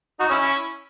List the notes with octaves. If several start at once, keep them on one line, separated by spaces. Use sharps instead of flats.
D#4 F#4
C#4 E4
C#4 E4